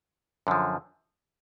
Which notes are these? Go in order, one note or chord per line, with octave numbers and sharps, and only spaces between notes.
F#2 D3 F3